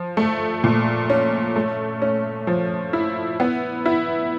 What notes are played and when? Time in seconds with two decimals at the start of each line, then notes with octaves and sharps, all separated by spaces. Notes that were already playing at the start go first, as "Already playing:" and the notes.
Already playing: F3
0.17 A3
0.64 A#2
1.10 C#4
1.56 A3
2.02 C#4
2.47 F3
2.93 E4
3.40 B3
3.86 E4